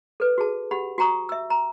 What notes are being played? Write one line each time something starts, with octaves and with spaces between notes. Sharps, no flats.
A4 B4
F#4 G#4 A5
G4 F#5 B5
F#4 G5 A#5 C#6 D#6
E5 E6
A#5